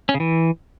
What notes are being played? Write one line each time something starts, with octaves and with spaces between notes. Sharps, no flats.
C#4
C#3
E3